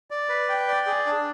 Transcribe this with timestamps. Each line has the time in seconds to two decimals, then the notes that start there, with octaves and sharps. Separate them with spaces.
0.11 D5
0.29 B4
0.49 G5
0.68 D5
0.87 G#4
1.06 D4